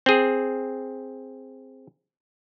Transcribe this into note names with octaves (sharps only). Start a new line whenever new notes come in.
C4 G#4